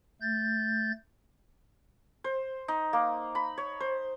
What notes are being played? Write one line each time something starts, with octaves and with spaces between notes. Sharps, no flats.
A3 G6 A6
C5
D#4
A#3
B5
C#5
C5